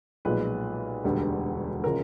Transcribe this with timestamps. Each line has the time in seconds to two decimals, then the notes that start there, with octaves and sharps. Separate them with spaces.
0.25 B1 A#2 F3 G#3 B4
1.04 E1 D2 D3 G3
1.84 C#3 F3 G#3 A#4